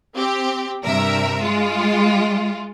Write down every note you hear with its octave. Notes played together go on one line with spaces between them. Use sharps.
C4 G4
G2 C3 A#4 E5
G#3 F4